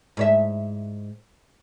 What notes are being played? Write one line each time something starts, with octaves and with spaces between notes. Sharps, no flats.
G#2 C#5 E5